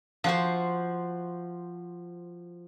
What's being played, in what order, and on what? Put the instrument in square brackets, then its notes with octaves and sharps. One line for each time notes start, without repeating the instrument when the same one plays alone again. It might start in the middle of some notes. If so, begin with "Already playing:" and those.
[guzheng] F3 F#4 C5